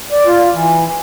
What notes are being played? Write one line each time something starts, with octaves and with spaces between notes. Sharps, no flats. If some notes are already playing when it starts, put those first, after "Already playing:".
D5
F4
E3